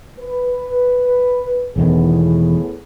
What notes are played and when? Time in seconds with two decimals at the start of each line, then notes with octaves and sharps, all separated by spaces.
0.19 B4
1.76 E1 E2 A2 D#3 B3 G#4